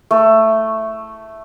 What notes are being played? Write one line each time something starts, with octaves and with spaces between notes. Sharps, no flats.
A3